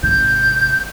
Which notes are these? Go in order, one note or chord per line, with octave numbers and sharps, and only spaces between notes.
G#1 C3 G6